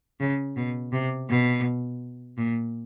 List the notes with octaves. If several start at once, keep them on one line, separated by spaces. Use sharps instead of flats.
C#3
B2
C3
B2
A#2